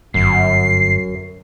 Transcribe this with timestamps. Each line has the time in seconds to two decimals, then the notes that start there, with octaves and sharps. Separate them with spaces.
0.14 G1 F#2 C7